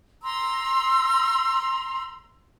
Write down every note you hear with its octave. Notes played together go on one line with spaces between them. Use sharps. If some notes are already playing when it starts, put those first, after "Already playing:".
A#5 C6 E6